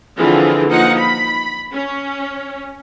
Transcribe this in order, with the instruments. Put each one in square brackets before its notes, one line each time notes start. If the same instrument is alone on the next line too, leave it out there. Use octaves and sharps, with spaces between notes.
[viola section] D3 E3 F3 C4 F4 G#4
F3 A#3 D#4 F#5
B5
C#4